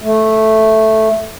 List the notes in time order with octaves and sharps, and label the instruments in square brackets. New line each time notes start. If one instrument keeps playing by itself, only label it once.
[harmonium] A3